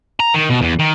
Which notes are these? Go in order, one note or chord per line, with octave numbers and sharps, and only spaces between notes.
A#5
D#3
B2
E2
D#3